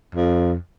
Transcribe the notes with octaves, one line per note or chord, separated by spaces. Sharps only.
F2